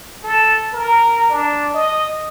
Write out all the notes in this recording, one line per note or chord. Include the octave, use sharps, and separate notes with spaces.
A4
A#4
D4
D#5